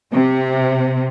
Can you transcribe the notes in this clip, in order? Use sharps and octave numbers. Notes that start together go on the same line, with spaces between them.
C3